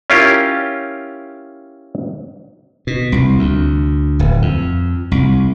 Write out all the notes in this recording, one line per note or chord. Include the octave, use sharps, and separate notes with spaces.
C#4 E4 F4 G4 A#4
B2
C2
D2
D1
F2
C2